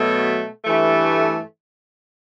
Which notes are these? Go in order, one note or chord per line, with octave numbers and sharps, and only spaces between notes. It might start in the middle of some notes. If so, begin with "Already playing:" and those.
Already playing: B2 F#3 A3
G2 E3 A3